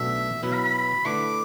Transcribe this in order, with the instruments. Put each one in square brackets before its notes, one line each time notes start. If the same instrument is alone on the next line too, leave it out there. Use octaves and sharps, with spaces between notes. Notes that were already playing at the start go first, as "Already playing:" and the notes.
Already playing: [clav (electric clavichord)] B1 B2 A3 D4 F#4 [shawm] E5
[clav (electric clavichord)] B2 F#3 B3 E4 B4 [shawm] E5
[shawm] B5
B5
[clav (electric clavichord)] D3 A3 E4 B4 [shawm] D6